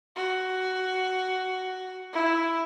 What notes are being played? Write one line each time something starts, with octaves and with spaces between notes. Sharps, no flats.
F#4
E4